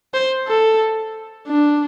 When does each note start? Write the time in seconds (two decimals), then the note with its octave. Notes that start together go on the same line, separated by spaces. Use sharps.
0.14 C5
0.48 A4
1.48 D4